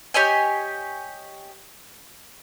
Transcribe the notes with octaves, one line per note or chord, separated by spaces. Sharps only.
G4 C#5 D#5 G#5